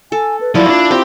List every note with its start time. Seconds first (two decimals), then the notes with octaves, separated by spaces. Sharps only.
0.12 A4 G#5
0.41 B4
0.55 F3 F#3 A#3 E4 D5
0.69 D4 F4
0.91 C4 G4